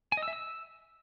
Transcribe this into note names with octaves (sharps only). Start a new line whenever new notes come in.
G#5
D#5
E6
E5
E6